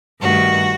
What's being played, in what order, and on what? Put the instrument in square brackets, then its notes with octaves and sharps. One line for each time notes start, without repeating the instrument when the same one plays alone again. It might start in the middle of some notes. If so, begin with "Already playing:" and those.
[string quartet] G2 D#3 A3 F#4